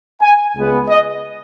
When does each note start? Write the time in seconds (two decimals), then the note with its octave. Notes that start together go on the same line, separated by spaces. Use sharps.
0.22 G#5
0.56 C#2 C#3 G#3 B3
0.89 D#5